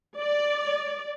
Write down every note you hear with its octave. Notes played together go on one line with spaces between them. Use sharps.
D5